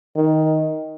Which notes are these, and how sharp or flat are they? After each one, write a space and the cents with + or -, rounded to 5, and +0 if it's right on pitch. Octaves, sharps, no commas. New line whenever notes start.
D#3 +10